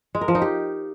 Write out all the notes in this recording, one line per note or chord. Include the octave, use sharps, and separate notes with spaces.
G#3
A#4
F3
D#4
G4